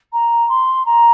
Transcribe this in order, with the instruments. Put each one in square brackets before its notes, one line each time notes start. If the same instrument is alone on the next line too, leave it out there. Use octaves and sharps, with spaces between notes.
[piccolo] A#5
C6
A#5